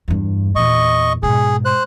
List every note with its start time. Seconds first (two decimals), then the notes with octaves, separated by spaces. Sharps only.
0.08 E2 G2
0.56 E2 A#2 D#5 C#6
1.23 G#2 B2 G#4
1.65 C5 F#6